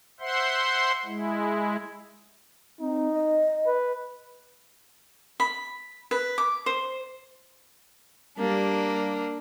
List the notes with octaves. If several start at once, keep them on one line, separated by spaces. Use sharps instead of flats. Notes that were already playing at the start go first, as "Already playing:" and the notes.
C5 E5 F#5 C6
G#3 E4
C4 D#4
D#5
B4
B5
B4
D6
C5
G3 A#3 D4